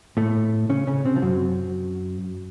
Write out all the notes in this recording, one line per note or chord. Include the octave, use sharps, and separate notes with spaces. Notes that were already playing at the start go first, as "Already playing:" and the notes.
A2 A3
C#3 C#4
C#3 C#4
C3 C4
F3
F#2 F#3